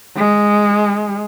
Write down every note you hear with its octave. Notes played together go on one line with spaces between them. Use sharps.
G#3